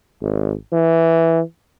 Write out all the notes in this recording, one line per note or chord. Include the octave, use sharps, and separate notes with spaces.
G#1
E3